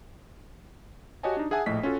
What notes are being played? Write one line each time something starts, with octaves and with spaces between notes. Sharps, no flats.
F#4 G4 C#5 D#5 G#5 A5
D4 D#4
G#4 E5 F#5 G#5 A5 D#6
A#1 A2 D#5 B6
C#4 F4 F#4 A4